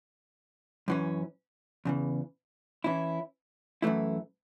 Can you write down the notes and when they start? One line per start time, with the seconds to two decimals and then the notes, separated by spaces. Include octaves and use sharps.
0.88 F#2 E3 C#4
1.85 E2 C#3 E3
2.84 E3 C#4 E4
3.82 F#2 E3 A3 E4